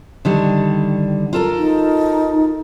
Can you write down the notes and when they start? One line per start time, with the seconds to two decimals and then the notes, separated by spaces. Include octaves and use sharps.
0.25 D3 D#3 G3
1.33 F4 A4 A#4
1.57 D#4